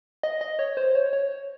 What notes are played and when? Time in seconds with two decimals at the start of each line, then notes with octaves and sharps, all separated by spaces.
0.23 D#5
0.41 D#5
0.59 C#5
0.77 C5
0.95 C#5
1.13 C#5